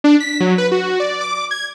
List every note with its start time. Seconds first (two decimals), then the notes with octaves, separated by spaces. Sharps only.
0.04 D4
0.20 B6
0.40 F#3
0.58 B4
0.72 F#4
1.00 D5
1.21 D6
1.51 G#6